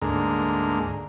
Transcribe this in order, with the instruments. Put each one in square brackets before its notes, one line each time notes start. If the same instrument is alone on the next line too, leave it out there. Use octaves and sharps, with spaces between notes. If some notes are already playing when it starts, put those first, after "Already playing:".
[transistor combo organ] D2 G#2 A#3